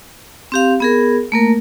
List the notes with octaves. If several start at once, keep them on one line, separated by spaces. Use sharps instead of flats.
C4 G4 F5
B3 G#4 A#4
A3 A#3 A#4